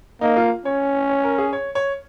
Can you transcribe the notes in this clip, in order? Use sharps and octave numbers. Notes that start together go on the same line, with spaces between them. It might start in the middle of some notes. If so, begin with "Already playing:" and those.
A#3 D#4
F4
C#4 C#5
C#5
A#4
G#4
C#5
C#5